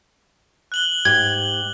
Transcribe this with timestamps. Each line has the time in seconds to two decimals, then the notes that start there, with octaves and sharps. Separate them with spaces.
0.72 F#6 F#7 G7
1.05 G#2 G4 G#6